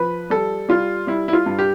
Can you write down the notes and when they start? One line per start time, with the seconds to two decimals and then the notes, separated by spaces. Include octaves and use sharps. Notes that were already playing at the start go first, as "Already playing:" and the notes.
Already playing: F3 B4
0.30 G3 A4
0.69 G3 F4
1.07 G3 E4
1.28 E4
1.33 F4
1.46 G2
1.59 G4